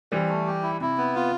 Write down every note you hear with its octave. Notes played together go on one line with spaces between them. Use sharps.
E3 G3 C4
A3
G4
E4
C3 E4
B3
F4